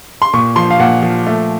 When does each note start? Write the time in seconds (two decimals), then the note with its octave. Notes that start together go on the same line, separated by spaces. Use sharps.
0.22 C6
0.33 A#2 C#6
0.56 F3 C6
0.70 F5
0.79 A#2 F#5
1.02 F3
1.27 A3